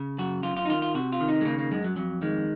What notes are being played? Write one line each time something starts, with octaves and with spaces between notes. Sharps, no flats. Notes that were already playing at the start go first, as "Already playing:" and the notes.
Already playing: C#3
F#2 F#4
F#2 F4
F4
D#4
D#3 F4
F4
C3 F#4
F4
D#3
D#4
G#3
C#3 A#3
A#3
F#2 G#3
F#3
F2 F#3
D#3 G#3